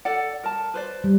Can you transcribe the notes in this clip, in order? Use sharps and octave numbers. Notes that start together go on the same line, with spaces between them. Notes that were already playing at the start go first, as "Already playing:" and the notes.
A4 D5 F#5
A#4 A5
B4 C5 D5
G3